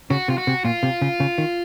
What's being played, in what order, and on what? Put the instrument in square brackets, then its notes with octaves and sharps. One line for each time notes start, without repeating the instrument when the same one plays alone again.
[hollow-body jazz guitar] C#3 [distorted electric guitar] F#4
[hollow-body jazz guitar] C3 [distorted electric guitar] F4
[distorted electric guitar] F#4
[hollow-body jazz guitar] C3
[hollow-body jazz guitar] A#2 [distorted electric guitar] F4
[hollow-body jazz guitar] C3
C#3
C#3
D#3